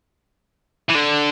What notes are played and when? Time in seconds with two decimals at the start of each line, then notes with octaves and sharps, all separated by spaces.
0.89 E3
0.94 D3